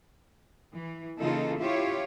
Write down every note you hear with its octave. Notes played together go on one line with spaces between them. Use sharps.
E3
C#3 E3 A#3 D#4 F4 A4
E4 F4 G4 C#5